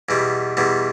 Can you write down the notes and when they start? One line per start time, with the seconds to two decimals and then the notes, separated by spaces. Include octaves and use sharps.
0.09 E2 B2 G3
0.57 E2 B2 G3